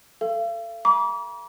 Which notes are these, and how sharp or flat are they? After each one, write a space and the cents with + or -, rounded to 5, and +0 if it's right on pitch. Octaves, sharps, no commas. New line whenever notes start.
A4 +10 F5 -40
A#5 +45 D6 -35